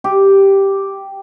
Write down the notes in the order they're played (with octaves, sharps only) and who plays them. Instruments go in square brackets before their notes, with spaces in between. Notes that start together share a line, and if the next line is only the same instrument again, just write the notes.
[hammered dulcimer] G4